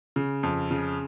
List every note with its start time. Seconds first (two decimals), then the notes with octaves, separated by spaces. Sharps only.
0.16 C#3
0.43 F2
0.71 C#3